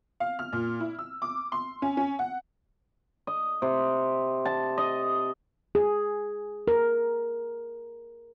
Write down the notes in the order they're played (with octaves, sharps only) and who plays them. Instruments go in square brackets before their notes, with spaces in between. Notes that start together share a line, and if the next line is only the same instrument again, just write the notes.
[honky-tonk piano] F5
F6
A#2
E4
E6
D6
C6
C#4
C#4
F#5
[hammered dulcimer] D#5
C3
A5
D#5
[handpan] G#4
A#4